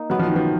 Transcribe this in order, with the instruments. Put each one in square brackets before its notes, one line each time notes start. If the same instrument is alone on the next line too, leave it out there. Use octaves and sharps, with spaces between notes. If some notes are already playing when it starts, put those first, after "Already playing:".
Already playing: [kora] A#3 D#4
[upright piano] F#3 [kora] B3
[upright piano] F3
D#3
F3